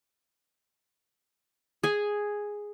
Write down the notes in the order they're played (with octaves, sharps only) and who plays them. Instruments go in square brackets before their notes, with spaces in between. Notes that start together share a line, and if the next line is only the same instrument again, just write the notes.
[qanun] G#4 G#5